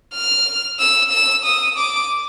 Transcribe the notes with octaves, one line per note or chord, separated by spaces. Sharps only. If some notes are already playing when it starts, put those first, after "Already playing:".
F6
E6
E6
D#6
D6